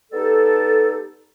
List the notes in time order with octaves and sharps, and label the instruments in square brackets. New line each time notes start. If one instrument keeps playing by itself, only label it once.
[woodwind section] G3 B3 D#4 G4 A4